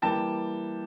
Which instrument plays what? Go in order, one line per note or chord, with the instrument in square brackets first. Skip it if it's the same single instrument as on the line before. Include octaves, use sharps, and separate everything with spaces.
[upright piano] E3 G3 A#3 G5 A5